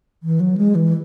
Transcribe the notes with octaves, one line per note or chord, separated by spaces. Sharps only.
E3
F#3
G#3
E3